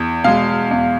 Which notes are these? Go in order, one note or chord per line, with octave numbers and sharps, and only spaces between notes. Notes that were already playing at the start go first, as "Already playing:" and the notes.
Already playing: E2
B2 G#3 F5
E2